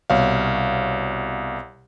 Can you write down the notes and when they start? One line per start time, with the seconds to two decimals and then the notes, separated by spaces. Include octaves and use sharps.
0.10 C2 B2 C#5 F5